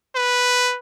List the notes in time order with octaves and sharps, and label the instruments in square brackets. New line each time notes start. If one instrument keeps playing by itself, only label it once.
[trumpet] B4